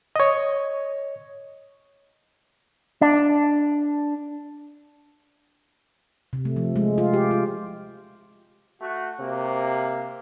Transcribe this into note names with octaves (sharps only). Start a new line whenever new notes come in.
C#5 D#5
D4
C3
A3
F3
G#3
F4
G4
F4
A3 F#4
C3 A#3